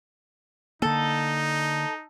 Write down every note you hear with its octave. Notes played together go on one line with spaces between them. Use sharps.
D3 A#3 D#4 A4